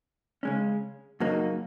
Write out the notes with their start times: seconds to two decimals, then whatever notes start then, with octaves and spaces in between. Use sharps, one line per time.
0.43 C#3 G#3 C#4
1.20 F#2 C#3 F#3 A#3 D#4